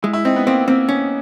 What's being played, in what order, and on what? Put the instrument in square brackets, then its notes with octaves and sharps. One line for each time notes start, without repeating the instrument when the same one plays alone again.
[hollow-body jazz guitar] G#3 [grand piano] E4
[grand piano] E4
[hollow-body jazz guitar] C4 [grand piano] D#4
[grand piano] B3
[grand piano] A#3 [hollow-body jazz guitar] C4
[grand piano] A#3 [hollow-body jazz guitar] C4
[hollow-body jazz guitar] C#4